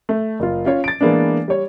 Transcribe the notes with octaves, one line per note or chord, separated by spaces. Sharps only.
A3
F#1 F4
C#4 F4 C#5
A6 D7
E3 G#3 A#3 B3 D4
G3 C#5